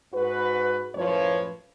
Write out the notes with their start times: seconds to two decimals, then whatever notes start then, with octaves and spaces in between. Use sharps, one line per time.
0.13 G#2 F#4 B4
0.95 F#2 A2 F3 B4 C#5